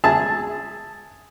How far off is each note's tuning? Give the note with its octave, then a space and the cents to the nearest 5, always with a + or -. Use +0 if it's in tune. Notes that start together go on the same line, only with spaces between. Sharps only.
G#4 -5 E5 +0 A5 +0